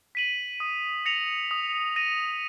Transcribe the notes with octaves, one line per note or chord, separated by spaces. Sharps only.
B6 D#7 F#7
D#6
A#6 C#7 F7
D#6
A#6 D#7